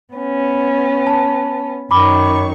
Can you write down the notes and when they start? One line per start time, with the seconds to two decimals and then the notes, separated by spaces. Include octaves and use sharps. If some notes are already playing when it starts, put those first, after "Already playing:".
0.14 B3 C#4
1.07 A5
1.91 F#2 D#3 B5 C#6 D6